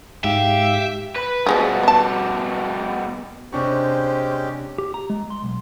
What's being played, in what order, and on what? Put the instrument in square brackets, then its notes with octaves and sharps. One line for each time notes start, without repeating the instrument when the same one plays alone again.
[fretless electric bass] G#2 [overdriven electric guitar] G4 [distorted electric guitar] E5 [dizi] F5
[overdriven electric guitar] B4
[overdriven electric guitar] B2 G3 [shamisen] F3 G#3 B3
[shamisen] B3 A5
[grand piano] C3 D4 C#6 [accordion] G#3 C#4 G4 [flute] C5
[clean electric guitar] G4
A#5
G#3
C6
B1